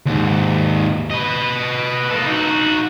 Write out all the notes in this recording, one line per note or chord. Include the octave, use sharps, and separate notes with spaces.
D#2 G#2
B4 D#5
A#3 A4
D#4 F#4